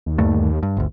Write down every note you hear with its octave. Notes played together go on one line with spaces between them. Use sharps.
D#2
D2 G2 A3
G2
G1 D2